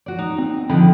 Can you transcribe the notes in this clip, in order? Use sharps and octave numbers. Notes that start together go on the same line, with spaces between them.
F#4 D5
D#4
C4
D3 D#3 F3 D#4 G5 B5